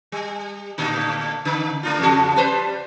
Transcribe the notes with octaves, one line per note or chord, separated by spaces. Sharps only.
G3
A2 D3 D#4
C#3 D#4
A3 D4 F4
E2 C#3 F#4
G3 B4 C5